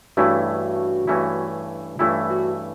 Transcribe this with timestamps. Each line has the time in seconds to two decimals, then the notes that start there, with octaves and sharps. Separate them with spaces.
0.17 G2 E3 A3 C#4 E4 F#4
1.07 G2 E3 A3 C#4 E4
1.99 G2 E3 A3 C#4 E4 F4
2.30 F#4